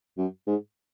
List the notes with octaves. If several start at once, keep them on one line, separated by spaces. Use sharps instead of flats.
F#2
G#2